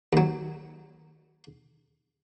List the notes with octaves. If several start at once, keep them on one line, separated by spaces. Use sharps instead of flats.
D#2 F#3